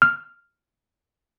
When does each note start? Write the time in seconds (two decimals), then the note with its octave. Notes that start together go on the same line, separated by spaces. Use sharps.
0.02 F6